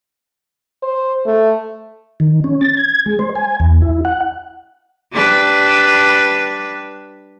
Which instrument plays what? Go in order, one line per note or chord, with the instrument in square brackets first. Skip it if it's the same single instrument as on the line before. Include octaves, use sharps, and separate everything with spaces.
[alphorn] C5
A3
[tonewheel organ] D#3
C#4
A6
G#6
G#3
C5
G#5
E2
E4
F#5
[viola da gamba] G3 D4 B4